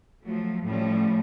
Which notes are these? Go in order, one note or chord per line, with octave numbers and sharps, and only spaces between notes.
F3 F#3 A3
A2 F3 G3 C#4